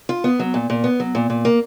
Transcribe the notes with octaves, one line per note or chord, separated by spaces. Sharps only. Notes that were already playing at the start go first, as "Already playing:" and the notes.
F4
B3
F#3
A#2
A#2
B3
F#3
A#2
A#2
A#3